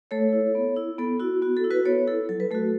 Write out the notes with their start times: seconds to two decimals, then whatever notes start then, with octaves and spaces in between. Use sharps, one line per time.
0.11 A3 A4 C#5
0.33 E4
0.55 B3
0.76 E4
0.98 B3 A4
1.20 E4 F#4
1.42 B3 F#4
1.57 A4
1.64 E4
1.71 F#4 B4
1.85 B3 A4 C#5
2.07 E4 A4
2.29 F#3 A4
2.40 B4
2.51 A3 F#4 A4